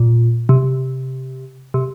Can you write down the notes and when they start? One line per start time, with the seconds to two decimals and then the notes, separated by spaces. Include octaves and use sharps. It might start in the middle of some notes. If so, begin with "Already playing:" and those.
Already playing: A#2
0.49 C3
1.74 C3